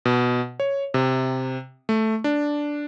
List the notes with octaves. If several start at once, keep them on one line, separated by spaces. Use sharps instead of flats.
B2
C#5
C3
A3
D4